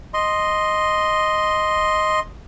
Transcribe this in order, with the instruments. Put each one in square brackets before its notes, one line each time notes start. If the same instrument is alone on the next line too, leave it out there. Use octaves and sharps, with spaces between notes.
[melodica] D#5 C6